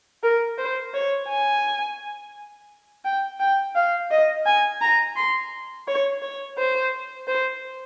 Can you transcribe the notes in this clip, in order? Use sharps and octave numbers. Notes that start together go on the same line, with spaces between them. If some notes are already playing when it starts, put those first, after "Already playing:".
A#4
C5
C#5
G#5
G5
G5
F5
D#5
G#5
A#5
C6
C#5
C#5
C5
C5